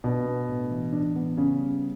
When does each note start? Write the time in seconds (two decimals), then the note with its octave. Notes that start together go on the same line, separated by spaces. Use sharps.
0.04 B2 D4
0.26 B3
0.49 A2
0.71 E3
0.93 D4
1.16 B3
1.37 C#3 C#4
1.59 G3